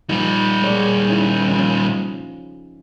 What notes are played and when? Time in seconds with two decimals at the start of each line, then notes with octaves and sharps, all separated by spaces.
0.09 A#2 F3 G3 D#4
0.62 G#3 C#5 D5
1.09 C#4 D#4 E4
1.48 F3 C#4 F4